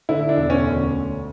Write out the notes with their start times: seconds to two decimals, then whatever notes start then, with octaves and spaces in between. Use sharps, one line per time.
0.09 D3 E4
0.29 D4
0.37 E1
0.50 C#4
0.63 D2